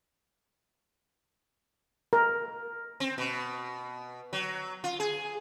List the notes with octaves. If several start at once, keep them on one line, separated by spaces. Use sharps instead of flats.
A#4
C4
B2
F#3
F4
G#4